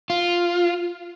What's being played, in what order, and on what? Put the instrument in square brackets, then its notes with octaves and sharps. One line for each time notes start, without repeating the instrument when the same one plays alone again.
[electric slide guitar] F4